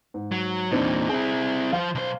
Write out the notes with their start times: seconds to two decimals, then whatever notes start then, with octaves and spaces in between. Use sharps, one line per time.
0.14 G#2
0.32 F#3
0.71 E2 A#2 C4 D4 D#4
1.09 C4 E4 G#4
1.73 F3 C5 F5
1.95 B1 C5